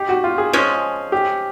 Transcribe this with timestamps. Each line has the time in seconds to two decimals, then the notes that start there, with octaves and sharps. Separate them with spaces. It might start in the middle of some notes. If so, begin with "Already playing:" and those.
Already playing: D#4 G4
0.09 F#4
0.24 F4
0.38 G#4
0.53 F3 G#3 C#4
1.12 G4